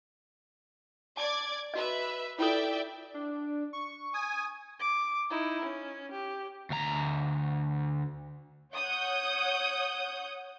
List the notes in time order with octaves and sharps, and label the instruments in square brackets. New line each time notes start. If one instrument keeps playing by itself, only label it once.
[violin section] D5 D6 G#6 [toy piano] A5
[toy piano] F#4 D#5 [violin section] B4 E5
[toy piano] E4 F4 A4 [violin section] D5 E5 G5
[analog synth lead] D4
C#6
[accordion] G#5 [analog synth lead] D#6
[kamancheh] D6
D#4 E4
C#4
G4
[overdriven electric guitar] D2 A#5
[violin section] C#5 F#5 D#6 G6